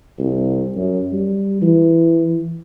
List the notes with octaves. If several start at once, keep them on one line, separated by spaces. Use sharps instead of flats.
C2
F#2
G3
E3